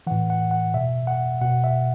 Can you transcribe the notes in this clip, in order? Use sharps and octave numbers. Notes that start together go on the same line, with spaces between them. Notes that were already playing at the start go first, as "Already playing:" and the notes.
A2 E3 F#5
F#5
F#5
B2 E5
F#5
B2 F#5
E5